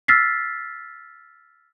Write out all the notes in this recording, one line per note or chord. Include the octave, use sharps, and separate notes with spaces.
E6 F6 A6 B6 C7